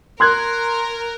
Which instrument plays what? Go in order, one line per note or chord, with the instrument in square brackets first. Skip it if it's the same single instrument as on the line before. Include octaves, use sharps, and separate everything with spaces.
[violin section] A#4 [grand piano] C6 F#6 G#6